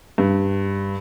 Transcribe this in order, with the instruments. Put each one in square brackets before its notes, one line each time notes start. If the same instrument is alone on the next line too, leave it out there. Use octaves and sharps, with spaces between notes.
[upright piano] G2